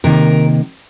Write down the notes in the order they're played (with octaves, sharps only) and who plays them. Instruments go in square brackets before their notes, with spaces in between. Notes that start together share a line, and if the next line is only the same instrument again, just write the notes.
[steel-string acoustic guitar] C3 D#3 A#3 A#4